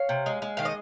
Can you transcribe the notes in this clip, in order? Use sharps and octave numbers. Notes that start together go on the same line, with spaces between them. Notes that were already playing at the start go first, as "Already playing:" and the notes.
Already playing: C#5 F5
C3
G#3
G#3
D#3 F5
D#5